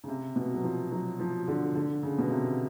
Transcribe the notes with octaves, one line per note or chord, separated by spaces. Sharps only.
C#3
C3
B2
F#3
F3
F#3
F3
D3
D3
C#3
B2
C3